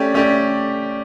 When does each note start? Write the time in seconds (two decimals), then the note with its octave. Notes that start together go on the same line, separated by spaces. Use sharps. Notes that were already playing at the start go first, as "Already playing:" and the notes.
Already playing: A3 C#4 G4 D5
0.14 A3 C#4 G4 D5